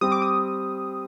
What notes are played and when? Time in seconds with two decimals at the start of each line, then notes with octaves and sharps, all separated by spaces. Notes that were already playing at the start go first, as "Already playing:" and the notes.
0.01 G3 C4 G4 D#6
0.12 D6
0.22 D#6